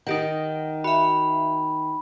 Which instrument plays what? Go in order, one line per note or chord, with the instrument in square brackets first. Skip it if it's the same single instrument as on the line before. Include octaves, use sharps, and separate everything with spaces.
[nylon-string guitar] D#3 [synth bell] D#4 G4 F#5
[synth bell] F#4 E5 [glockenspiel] B5